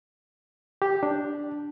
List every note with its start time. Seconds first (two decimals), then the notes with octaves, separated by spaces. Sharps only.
0.82 G4
1.03 D4